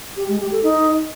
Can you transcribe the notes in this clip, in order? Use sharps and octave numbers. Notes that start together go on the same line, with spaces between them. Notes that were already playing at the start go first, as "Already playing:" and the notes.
G4
G#3
G4
A4
D#4